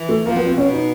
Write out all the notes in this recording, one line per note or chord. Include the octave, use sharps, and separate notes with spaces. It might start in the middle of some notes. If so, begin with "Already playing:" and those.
Already playing: E3
A3
F3 A#3
B3
C4
B2 C#4
D#4